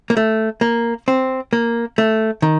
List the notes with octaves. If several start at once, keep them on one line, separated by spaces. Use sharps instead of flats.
A#3
A3
A#3
C4
A#3
A3
D#3